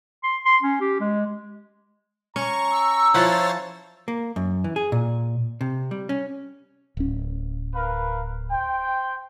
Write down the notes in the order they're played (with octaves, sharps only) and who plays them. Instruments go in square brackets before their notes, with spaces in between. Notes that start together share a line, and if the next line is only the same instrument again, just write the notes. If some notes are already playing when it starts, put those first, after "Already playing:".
[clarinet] C6
C6
C#4
G4
G#3
[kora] C#4 [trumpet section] A#5 [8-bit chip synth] C#6
[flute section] E6
[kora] F3 E4 F#5 [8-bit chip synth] C5 C#5 A6
[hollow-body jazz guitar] A#3
F#2
E3
G#4
A#2
C3
G3
C#4
[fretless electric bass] D1 C#4
[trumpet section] A#4 B4 F5
C5 G5